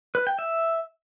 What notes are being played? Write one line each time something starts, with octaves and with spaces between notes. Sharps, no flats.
B4
G5
E5